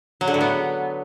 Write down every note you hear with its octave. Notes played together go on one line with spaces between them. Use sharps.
F#3
D3
A2
B3